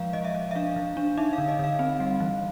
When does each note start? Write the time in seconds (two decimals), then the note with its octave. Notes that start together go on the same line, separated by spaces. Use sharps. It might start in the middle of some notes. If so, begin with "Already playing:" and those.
Already playing: F3 G#3 F5
0.13 F3 D#5
0.25 E5
0.35 F3
0.51 E5
0.55 D4 F5
0.76 E3
0.97 D4
1.17 D#4 E5
1.33 F5
1.38 D3
1.48 D#5
1.59 D3 F5
1.79 C4
2.00 G3
2.20 E3